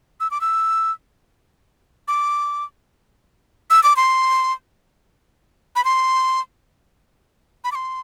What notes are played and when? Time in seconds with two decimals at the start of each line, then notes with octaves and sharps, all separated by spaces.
0.20 E6
0.31 D6
0.41 E6
2.08 D6
3.70 E6
3.83 D6
3.96 C6
5.76 B5
5.85 C6
7.64 B5
7.72 D6
7.75 C6